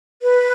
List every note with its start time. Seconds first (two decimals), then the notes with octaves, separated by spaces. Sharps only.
0.22 B4